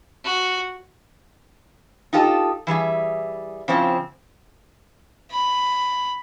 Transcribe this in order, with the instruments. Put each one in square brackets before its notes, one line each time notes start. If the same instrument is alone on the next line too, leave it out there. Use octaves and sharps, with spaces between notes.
[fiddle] F#4
[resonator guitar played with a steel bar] D#4 F4 G4 A4 D#5
E3 G3 G#4 E5
C#3 F3 C4 E4
[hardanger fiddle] B5